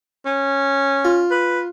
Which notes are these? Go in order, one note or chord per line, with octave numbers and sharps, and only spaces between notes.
C#4
F4
B4